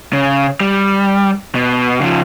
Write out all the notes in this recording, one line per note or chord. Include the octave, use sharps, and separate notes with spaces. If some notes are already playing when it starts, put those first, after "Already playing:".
C#3
G3
B2
C#3 F3